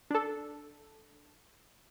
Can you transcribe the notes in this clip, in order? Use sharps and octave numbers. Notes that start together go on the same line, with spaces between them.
D4 A4